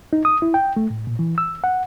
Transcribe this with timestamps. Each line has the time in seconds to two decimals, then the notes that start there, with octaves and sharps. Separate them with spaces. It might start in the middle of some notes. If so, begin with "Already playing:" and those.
0.13 D#4
0.25 D#6
0.42 E4
0.54 G5
0.77 A3
0.90 A2
1.07 A#2
1.19 E3
1.38 E6
1.64 F#5